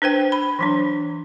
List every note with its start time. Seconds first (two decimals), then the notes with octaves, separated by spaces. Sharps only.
0.02 D4 B4 C5 G5
0.32 B5
0.59 E3 F#3 D4